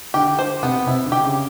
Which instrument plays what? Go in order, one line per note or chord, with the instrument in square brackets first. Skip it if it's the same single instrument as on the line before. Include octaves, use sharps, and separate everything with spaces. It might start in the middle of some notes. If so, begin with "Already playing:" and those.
[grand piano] D3 [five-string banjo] G4
[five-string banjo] C5
[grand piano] C3 [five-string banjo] B3
[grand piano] C3 [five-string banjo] E4
[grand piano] D3
[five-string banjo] G4
[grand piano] C#3